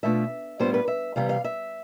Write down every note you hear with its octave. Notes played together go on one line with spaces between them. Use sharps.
B2 A3 D4 F4 E5
A2 G3 B3 D4 F4 C5
B4
E5
C3 E3 G3 B3 F5
F5
E5